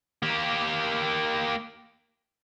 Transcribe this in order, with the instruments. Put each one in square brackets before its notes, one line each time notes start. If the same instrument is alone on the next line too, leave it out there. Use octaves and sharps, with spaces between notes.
[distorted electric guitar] A#3 G4